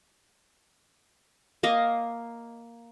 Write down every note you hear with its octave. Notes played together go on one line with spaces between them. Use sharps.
A#3 D#5 F5